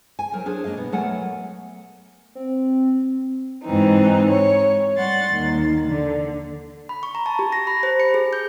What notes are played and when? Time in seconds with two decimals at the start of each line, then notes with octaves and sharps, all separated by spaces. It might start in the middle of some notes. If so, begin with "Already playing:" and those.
0.19 G#5
0.32 F#3 A#4 C5
0.46 D4 G#4 C5 C#5
0.64 A#3 D4 D#5 F5
0.77 B2 B3
0.92 F#3 A3 B3 A#4 F#5 G#5
2.35 C4
3.63 G#2 E3 C4 D#4
4.29 C#5
4.96 G3 F#5 C6 A6
5.33 D#2 D#3
5.87 D3
6.89 B5
7.03 C#6
7.15 A#5
7.26 A5
7.39 G4
7.52 A#6
7.67 B5
7.83 C5
8.00 C#7
8.14 G#4
8.33 G6